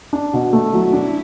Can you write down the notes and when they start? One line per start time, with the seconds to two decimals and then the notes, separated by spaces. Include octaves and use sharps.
0.13 D4
0.33 B2
0.53 A3
0.73 F#3 E4
0.93 D4